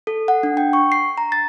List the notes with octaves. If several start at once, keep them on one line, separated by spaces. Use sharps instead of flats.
A4
F#5
D4
G5
C#6
C7
A#5
A6